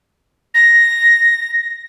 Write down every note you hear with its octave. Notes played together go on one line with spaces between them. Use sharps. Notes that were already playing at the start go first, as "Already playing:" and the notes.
A#6